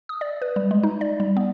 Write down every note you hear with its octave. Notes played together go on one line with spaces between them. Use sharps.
D#6
D5
B4
G3
G#3
D#4
D5
G3
B3